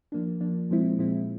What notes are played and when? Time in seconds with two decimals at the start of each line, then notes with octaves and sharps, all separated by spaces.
0.12 F3 A#3 D4
0.40 F3 A#3 D4
0.69 A#2 F3 G#3 C4 E4
0.99 A#2 F3 G#3 C4 E4